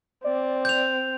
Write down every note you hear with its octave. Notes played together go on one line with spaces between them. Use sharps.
C4 D5
G6 F7